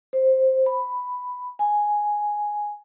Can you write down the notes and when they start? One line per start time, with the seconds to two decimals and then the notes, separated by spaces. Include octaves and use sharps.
0.13 C5
0.66 B5
1.59 G#5